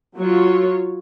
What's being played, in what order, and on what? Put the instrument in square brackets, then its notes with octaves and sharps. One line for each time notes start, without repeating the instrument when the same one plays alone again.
[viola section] F#3 F4 C#5